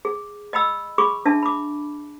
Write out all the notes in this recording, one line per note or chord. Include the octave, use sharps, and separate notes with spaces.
G#4
D#5 G5 B5 E6
G#4 B5 C#6 D6
D4 E5 A5
B5 D6